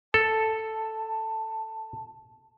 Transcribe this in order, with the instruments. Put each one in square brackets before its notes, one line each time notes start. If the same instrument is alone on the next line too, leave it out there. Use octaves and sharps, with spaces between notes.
[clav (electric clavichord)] A4 [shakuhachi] A5